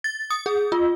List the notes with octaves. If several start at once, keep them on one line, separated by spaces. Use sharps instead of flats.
A6
D#6
G#4
F4